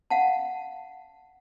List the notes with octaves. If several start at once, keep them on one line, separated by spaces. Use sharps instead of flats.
F5 F#5 A5